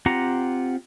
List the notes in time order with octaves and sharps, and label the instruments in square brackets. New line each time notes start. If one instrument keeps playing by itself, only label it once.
[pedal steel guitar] C4 F4 G4 F#5 A#5